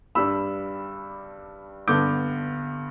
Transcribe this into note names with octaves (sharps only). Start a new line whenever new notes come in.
G2 G3 D4 B5 E6
G2 D3 B3 D6 G6